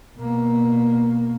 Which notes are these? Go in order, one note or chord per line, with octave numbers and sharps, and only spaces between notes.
B2 A#3